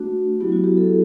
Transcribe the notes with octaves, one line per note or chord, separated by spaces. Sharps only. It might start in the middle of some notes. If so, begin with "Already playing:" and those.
Already playing: A3 D4 F#4
F#3 B3 E4 G4
F#4
G4
A4